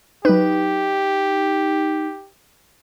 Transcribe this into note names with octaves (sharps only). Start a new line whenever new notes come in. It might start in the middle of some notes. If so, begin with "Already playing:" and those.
F#3 D#4 G4 B4